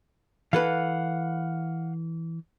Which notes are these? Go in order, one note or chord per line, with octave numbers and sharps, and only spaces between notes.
E3 A4 B4 F5 F#5